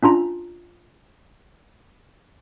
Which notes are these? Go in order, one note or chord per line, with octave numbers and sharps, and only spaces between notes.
C#4 D4 F4 A#5